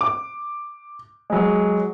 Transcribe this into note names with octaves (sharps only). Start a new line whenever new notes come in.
D6
F#3 G#3